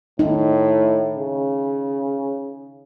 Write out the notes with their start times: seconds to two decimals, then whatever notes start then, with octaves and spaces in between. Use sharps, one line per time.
0.19 A2 D#4
1.15 C#3